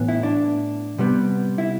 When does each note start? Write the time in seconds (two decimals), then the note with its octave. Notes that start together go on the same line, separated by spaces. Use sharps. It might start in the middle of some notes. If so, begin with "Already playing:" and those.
Already playing: A2 E3 B3
0.09 E4
0.23 D4
0.98 C3 G3 B3
1.58 E4